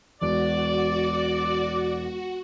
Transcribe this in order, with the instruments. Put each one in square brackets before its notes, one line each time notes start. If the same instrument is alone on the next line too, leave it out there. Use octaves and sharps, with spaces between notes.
[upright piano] E1 [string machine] F#4 [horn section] D5